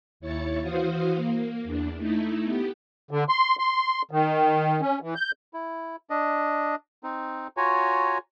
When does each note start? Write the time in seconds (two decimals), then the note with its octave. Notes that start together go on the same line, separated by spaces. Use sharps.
0.20 D#2 E4 C#5 A6 C#7
0.62 E3 F#4 C5 F5 D#6
1.15 A#3
1.64 E2 D4
1.97 A3 D#4 E4
2.43 B3 G4
3.11 D3
3.29 C6
3.59 C6
4.11 D#3
4.81 C#4
5.02 E3
5.16 G6
5.53 E4
6.10 D4 D#5
7.03 C4 D#4
7.57 F4 F#4 C#5 G#5 A#5